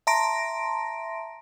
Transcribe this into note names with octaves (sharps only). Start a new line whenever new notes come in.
E5 A5 A#5 C6 A#6 D7